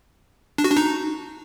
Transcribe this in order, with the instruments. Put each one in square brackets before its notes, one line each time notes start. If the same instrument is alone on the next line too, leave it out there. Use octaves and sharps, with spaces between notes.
[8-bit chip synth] D4
F#4
D4
D#4